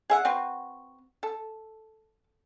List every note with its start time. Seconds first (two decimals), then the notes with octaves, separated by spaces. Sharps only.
0.10 G#4 E5 F#5
0.25 C4 F#4 B4
1.23 A4